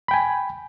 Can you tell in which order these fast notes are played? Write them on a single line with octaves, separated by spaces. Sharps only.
B5 G5 G#5